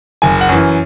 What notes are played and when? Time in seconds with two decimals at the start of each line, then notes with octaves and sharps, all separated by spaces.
0.22 F#1 G#5
0.41 F#5
0.49 F#2 E3